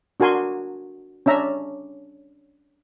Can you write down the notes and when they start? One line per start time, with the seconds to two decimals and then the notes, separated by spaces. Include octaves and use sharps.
0.20 D4 F#4 A#4 G#5 C6
1.26 C#4 D4 E5 A#5